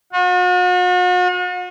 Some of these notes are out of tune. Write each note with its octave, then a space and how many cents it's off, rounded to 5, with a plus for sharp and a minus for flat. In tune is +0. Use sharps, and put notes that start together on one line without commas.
F#4 -45